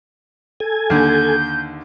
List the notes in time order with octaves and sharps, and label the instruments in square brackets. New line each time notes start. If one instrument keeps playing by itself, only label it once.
[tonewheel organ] A4 G#5
[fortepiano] D#2 D3 [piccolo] G6